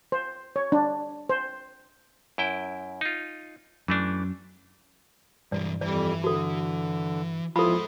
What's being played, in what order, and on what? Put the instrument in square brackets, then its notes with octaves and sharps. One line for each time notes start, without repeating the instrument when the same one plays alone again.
[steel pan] C5
C#5
D4
C5
[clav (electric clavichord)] F#2 E4 G5
D#4 F4
[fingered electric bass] F#2 [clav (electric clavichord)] E3 A3 D4
[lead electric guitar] B1 E3 [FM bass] G2 [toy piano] D5
[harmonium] F2 G3 [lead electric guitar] E3 [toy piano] D5
[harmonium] D3 [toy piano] F#4 A4
[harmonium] E2 E4 F4 [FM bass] F3 [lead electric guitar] G#3 C5 [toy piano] A4 B5